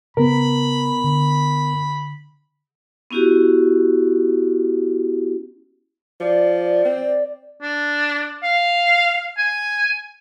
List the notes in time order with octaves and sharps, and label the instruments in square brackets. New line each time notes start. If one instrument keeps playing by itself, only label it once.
[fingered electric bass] C#3 [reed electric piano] B3 A#4 [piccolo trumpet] B5
[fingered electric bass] D3
[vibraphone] B3 C#4 E4 F#4 G4
[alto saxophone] F3 [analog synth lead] D5
[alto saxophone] C4
[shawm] D4
F5
G#5